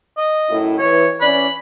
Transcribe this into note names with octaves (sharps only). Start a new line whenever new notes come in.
D#5
F#2 A2 E4
E3 C#5
E3 C#4 D5 B5